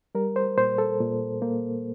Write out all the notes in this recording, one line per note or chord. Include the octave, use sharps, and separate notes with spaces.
G3 A#4
C5
A#2 C5
A4
A#2
A#3